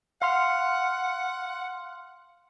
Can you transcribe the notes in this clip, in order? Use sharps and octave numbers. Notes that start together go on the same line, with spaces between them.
F5 F#5 C6 F6